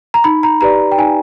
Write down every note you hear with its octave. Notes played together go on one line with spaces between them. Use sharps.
A#5
D#4 B5
A#5
G4 B4 D5 A#5
G5
D#4 G#5